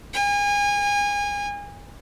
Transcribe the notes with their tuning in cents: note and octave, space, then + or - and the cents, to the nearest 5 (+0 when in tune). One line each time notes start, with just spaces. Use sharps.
G#5 -30